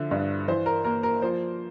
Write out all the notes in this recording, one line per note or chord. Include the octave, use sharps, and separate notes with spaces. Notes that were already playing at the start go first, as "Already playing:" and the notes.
Already playing: D3 F3 E5
G2
E3 C5
A#4
A#3 A#4
A#4
F3 C5